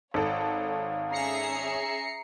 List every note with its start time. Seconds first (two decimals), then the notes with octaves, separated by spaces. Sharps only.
0.14 G#1 A4 C#5 F5
1.11 C#4 G#4 E5 A#5 C7 C#7